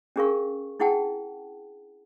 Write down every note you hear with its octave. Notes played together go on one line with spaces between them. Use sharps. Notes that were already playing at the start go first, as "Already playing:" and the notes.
C#4 D4 G#4 A#4 F5 C#6
D4 E4 G#4 F#5 G5 A5